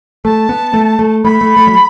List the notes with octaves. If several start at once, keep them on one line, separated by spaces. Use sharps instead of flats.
A3 A5
B3
A3
A3
A3 B5
A3
A3
F#3